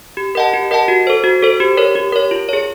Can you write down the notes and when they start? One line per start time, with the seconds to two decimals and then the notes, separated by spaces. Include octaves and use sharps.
0.17 G4
0.35 A#4 D#5 F#5 A5
0.54 G4
0.71 A#4 D#5 F#5 A5
0.88 F#4
1.07 A4 C5
1.24 F#4
1.42 A4 C5
1.60 G4
1.77 A#4 C#5
1.95 G4
2.12 A#4 C#5
2.31 F4
2.49 G#4 C#5